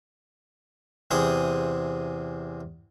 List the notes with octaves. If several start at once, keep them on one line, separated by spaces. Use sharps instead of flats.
E2 C3 G#4 C5 D#6